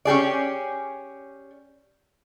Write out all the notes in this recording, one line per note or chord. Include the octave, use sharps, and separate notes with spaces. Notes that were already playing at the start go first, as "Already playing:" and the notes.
C#4 G4 G#4 D5